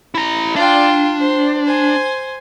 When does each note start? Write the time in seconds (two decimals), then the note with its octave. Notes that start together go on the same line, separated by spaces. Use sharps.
0.15 E4 A#5
0.56 D4 F4 G5
1.20 C5
1.65 C5 G#5